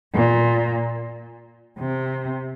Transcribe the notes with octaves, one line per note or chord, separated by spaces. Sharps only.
A#2
C3